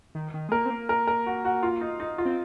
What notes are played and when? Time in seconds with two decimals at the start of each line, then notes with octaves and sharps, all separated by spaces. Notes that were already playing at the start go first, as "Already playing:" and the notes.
0.15 D#3
0.34 D#3
0.49 G#3
0.52 A#3 A#4
0.65 C4
0.70 A#3
0.89 A#4
1.07 A#4
1.26 F#4
1.45 F#4
1.63 F4
1.81 D#4
2.00 D#4
2.18 F4
2.25 C4